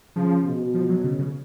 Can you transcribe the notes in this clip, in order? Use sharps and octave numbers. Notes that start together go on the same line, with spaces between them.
C#3 F3
B2
F3
F#3
C#3
C#3